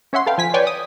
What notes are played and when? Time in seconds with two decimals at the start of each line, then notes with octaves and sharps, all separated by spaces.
0.13 C#4 C#5 E5 F#5 C6
0.26 A4 B4 F5 G5
0.38 F3 G#5 B6
0.54 B4 C#5 D5 G5 G#5 C#6
0.67 D#6